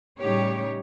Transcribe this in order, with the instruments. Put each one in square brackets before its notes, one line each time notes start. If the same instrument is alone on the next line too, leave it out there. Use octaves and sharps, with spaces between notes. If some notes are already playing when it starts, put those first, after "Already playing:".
[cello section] A2 C#3 G3 D#4 G4 C#5